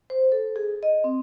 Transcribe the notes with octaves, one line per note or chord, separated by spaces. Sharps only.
C5
A4
G#4
D#5
C4